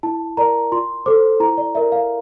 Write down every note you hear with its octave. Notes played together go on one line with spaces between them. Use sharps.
E4 A5
A#4 D5 A#5
F4 C6
A4 C5 D6
E4 A#5
D5
A#4 D5 E5
F5